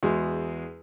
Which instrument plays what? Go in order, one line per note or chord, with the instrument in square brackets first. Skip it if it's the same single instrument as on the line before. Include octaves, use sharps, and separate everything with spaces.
[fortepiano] E2 G#3 F#4